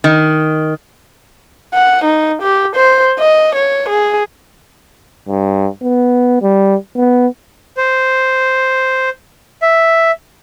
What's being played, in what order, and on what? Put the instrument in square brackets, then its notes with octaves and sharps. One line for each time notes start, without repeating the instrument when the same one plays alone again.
[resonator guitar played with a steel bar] D#3
[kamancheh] F#5
D#4
G4
C5
D#5
C#5
G#4
[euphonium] G2
B3
G3
B3
[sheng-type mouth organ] C5
E5